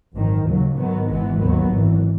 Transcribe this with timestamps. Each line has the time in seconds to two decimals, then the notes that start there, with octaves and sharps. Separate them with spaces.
0.14 G#1 F#2 D#3
0.45 D#2 C#3 F#3
0.76 G#2 D#3 F#3 B3
1.07 G#1 G#2 E3 G#3 B3
1.38 D#2 D#3 F#3 B3
1.69 G#1 F#2 E3